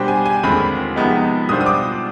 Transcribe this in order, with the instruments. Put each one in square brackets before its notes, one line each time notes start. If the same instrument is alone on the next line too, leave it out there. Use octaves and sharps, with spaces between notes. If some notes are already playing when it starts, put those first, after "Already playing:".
Already playing: [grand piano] B2 G3 D4 G4 C5 [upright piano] G5
[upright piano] G#5
G#5
[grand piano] D#2 D3 G#3 C4 F4 [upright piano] B5
[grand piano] C3 F3 G#3 B3 D#4
[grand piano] B2 G3 D4 F4 C5 [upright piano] D#6
[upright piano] D#6
D6